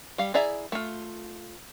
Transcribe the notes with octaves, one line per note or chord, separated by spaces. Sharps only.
G3 F5
E4 G#4 D5 E5 A#5
A3 F4